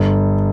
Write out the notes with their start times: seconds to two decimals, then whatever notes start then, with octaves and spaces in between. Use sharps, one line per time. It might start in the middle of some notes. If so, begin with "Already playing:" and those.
Already playing: G1